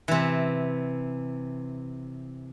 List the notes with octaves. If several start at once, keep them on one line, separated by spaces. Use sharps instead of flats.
C3 E3